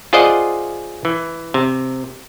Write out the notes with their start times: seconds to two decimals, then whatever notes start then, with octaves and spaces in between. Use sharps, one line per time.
0.13 F4 G#4 C5 D5 D#5 F#5
1.05 E3
1.54 C3